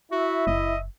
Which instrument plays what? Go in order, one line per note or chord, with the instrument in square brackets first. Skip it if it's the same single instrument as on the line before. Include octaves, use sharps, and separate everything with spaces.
[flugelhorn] E4 [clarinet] F#4 [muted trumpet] E5
[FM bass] F#1 [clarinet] D#5